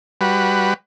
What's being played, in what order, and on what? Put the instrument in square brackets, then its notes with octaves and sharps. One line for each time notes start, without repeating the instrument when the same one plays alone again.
[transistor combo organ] G3 F#4 B4